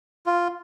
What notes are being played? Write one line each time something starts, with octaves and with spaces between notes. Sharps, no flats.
F4